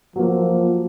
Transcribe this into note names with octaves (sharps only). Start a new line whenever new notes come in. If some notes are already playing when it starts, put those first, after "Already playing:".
F3 F#3 A#3 F4